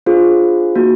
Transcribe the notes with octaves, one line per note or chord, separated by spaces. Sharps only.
D4 F4 G#4 C5
A#3 D#4 F#4